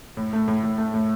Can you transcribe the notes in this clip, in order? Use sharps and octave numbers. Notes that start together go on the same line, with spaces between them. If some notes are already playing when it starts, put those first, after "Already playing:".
A2
A3
A2
A2
A3
A2